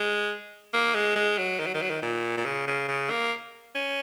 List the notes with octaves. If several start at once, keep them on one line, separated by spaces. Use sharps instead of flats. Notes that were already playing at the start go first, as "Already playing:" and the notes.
Already playing: G#3
A#3
G#3
G#3
F#3
D#3
F#3
D#3
F#3
D#3
A#2
A#2
C#3
C#3
C#3
A#3
C#4